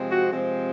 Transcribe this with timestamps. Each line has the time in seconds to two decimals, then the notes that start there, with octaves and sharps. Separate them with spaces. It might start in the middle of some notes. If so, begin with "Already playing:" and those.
Already playing: C3 F3 G#3 C4
0.11 F#4
0.29 C3 F3 G#3 C4